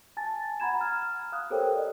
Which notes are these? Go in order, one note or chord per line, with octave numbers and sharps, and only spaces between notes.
G#5 A5 A6
F#5 A#5 B5 G#6 E7
F6
F5 D#6 F#6
G4 A4 A#4 C5 C#5 G5
D5 D#5